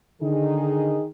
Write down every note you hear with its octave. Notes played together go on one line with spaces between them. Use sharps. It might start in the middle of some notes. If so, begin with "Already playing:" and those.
D3 D#3 D#4 G#4